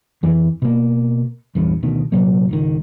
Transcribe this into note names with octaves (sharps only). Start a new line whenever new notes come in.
F2 E3
B2 A#3
A#1 E2 G2
D2 B2 D#3
C2 A#2 F#3 A#3
C#2 G#2 D#3